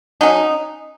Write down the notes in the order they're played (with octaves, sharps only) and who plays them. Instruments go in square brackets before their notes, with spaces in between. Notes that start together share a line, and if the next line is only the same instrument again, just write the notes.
[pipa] F#3 C#4 D#4